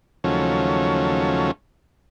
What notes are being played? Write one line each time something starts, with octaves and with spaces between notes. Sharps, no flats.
D#2 C#3 F3 F#3 A3 C#4